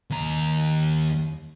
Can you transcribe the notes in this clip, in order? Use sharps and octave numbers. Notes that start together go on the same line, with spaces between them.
D#2 A#5